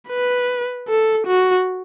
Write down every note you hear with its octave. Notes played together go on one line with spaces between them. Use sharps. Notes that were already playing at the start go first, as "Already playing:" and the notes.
B4
A4
F#4